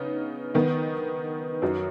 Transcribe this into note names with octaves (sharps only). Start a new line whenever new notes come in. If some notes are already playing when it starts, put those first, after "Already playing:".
Already playing: C#3 B3 D#4
D#3 B3 D#4
F#2 F#3 D#4